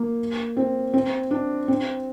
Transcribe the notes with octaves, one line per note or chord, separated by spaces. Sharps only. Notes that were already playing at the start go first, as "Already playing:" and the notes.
Already playing: A#3
C4
C4
D4
C4